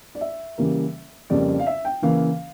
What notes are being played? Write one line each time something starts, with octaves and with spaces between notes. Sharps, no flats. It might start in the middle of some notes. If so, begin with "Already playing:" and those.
D5
E5
C#3 E3 G3 A#3
F2 C#3 G3 A#3 D5
D5
F5
E5
G5
C#3 E3 A#3 F5